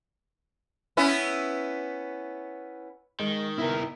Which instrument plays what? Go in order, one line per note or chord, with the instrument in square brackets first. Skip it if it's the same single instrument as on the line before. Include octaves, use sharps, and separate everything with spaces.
[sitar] B3 C#4 E4
[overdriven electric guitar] D#3 [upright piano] G#3
[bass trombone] B3 [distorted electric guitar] E4 A#4 [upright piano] E5